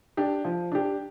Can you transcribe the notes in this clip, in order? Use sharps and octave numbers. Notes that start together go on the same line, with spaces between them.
D4 G4
F3
D4 G4